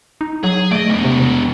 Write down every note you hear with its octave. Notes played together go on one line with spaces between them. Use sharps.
D#4
F#3 G#4
A3 D5 D#5
E2 B2
C3